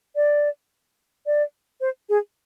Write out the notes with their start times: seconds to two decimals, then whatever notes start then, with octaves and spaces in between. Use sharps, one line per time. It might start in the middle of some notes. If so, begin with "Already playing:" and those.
0.16 D5
1.26 D5
1.81 C5
2.09 G#4